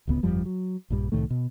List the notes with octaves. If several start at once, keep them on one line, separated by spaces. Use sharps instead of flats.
D1 C#2 B3
G1 F2 F3 G3
F#3
A#1 G2 G3
C2 A2 D#3 A3
B2